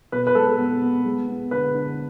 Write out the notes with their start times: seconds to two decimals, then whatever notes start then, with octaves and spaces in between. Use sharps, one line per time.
0.12 B2 B4
0.27 B4
0.35 G#3 A4
0.58 B3
0.82 B3
1.05 G#3
1.28 B3
1.51 D3 B4
1.75 D3